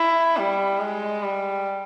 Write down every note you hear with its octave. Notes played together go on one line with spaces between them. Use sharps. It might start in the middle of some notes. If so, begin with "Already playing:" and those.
Already playing: E4
G3
G#3
G3